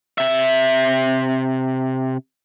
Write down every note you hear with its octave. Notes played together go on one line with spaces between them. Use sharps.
C3 E5